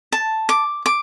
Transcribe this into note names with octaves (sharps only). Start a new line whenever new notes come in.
A5
D6
D6